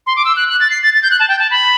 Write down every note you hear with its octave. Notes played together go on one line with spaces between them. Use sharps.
C6
D6
E6
F#6
F#6
A6
C7
A6
A6
G6
F#6
A5
G5
A5
B5